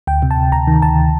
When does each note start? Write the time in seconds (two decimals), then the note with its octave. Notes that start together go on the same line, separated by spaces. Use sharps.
0.07 D2 G5
0.22 C3
0.31 A5
0.37 C3
0.52 D2 A#5
0.67 D#3
0.82 D2 A5